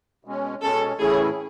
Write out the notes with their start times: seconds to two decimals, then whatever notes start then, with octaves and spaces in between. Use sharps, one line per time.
0.25 B2 G#3 C#4
0.62 B2 G#3 C#4 A4
1.00 A2 E3 A3 C#4 E4 G#4